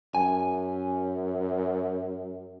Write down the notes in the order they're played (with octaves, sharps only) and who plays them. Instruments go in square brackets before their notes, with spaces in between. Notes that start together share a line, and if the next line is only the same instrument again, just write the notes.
[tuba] F#2 [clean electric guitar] G#5